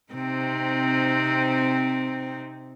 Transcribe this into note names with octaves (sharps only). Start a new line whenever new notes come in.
C3 C4 D#4